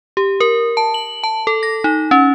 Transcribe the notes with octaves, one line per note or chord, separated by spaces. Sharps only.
G4
A#4
A5
F#7
A5
A4
A#6
D#4
C#4